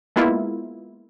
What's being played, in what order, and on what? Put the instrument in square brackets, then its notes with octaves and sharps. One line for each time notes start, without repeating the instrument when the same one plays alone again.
[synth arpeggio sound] G#3 A#3 B3 E4 F4